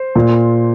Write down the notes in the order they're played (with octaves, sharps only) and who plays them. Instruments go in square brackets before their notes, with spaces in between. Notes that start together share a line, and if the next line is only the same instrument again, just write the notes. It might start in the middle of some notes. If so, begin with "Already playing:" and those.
Already playing: [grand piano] C5
A#2